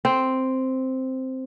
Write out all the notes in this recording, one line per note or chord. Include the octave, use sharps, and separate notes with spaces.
C4